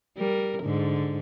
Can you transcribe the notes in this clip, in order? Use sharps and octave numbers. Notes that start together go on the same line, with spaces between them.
G3 A#4
G#2 D3